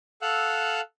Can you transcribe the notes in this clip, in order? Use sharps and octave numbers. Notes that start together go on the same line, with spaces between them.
A4 F5 F#5 E6 F#6